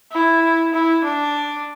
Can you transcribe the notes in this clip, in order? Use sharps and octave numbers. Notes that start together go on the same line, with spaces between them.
E4
E4
D4